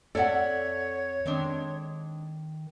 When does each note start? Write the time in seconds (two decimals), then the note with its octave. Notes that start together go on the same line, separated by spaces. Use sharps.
0.15 F2 A4 C#5 D5 E5 F#5
1.26 D#3 G#3 C4 D4